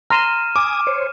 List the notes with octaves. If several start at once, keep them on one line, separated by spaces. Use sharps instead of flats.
A#5 C6 F6 D#7 E7
G#5 D6 D#6
C5 C#5